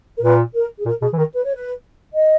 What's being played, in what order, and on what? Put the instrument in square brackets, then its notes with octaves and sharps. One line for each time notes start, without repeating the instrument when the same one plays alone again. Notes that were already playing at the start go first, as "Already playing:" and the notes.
[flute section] A#4
[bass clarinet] A#2 [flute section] B4
[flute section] A#4
G#4
[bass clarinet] A#2 [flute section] A#4
[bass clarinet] B2 [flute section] G#4
[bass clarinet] E3
[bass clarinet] D#3 [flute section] A#4
[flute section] B4
C#5
B4
D#5